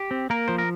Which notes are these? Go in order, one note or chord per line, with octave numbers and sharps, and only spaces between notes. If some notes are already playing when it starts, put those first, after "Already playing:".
Already playing: G4
C4
A#3 A#4
F3 C5
A#4